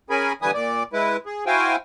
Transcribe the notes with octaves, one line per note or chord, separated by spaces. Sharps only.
C#4 G#4 A#4 G#5 B5
D3 E3 G3 B4 G#5 D#6
A#2 D5
G#3 E4 B4
G#4
E4 F#4 C5 F5 G5 G#5